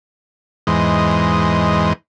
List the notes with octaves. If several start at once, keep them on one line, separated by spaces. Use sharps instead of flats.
E2 G#2 E3 G#3 C5 D#5